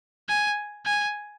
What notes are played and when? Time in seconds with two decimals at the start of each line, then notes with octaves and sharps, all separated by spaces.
0.29 G#5
0.86 G#5